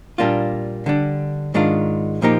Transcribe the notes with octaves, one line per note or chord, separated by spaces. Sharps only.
A#2 G3 A#3 D4 F4
D3 G3 D4
G#2 D#3 G#3 D4 F4
A#2 F3 A#3 D#4 G4